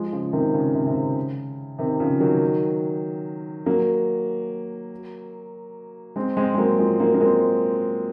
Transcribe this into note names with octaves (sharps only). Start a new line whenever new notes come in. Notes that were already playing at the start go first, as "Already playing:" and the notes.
Already playing: F3 G#3
C#3 F3
C3 D#3
C#3
C3
C3
C#3
C3 D#3
C#3 F3
D#3 F#3
F#3 A#3
G#3 C4
G#3 C4
G#3
F#3 A#3
F3 G#3
F#3 A#3
A#3
G#3 C4